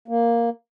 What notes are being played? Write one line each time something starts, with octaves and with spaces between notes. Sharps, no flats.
A#3